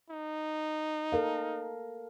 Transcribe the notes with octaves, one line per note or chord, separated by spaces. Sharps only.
D#4
A4 A#4 F5